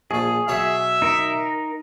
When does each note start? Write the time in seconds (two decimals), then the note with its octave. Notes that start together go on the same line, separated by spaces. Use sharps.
0.11 A#1 F3 G#4
0.48 B2 F#3 C#5 E5
1.02 D#4 A#4